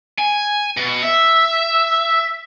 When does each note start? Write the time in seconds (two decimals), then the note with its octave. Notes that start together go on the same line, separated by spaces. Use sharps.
0.19 G#5
0.77 B2
1.02 E5